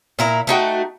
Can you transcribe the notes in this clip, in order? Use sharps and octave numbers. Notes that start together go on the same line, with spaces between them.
A#2 E4 A#5
A3 D#4 F#4 G5